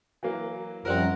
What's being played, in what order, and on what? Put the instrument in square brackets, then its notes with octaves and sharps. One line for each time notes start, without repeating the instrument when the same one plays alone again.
[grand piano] E3 F#3 A#3
[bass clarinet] F#2 [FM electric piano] F3 G3 C4 [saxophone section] A#4 F#5